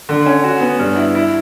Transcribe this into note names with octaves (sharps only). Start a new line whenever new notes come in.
D3
C#4
F#4
B3
G2
E4
E4